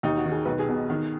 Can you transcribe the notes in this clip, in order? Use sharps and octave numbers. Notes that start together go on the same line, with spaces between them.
D#2 D#4
F#4
D#3
G#4
B1 B4
G#4
B2
D#3